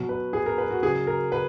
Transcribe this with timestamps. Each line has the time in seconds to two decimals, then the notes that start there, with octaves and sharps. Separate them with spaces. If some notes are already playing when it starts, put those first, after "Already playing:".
Already playing: B2 F#3
0.09 B4
0.33 G#4
0.46 A#4
0.58 B4
0.70 F#4
0.82 C#3 G#4
0.86 F#3
1.07 A#4
1.32 B4